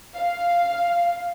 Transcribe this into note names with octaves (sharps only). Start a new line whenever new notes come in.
F5